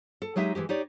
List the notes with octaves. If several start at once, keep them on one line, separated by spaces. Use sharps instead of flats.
A4
F#3 G#3 D#4 G4 E5
E3 F3 G#3 G4
D#4 G4 C#5 D5